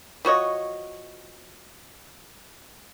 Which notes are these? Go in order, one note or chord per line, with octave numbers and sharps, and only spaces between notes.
F3 F#4 C#5 D#5